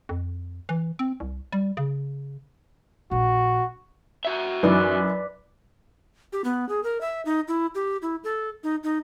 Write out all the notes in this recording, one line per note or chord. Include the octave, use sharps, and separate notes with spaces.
F2
E3
C4
C2
G3
C#3
A#1 F#4
F#4 E5
F#2 E3 D#4 B4 D5
G4
B3
G#4
A#4
E5
D#4
E4
G4
E4
A4
D#4
D#4